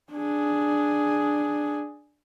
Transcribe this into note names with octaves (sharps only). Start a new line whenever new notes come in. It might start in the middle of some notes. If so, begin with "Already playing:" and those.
D4 G#4